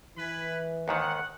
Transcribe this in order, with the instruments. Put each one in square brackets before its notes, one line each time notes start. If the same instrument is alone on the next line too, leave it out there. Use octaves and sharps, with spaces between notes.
[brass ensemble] E3 [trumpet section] B4 G#5 B5
[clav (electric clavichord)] D#2 G#2 D#3 [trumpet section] F#5